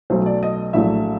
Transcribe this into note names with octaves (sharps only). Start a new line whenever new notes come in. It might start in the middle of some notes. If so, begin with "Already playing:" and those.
B1 B2 F#3 A3 C5
D5
D#5
A#1 A2 F#3 A3 E5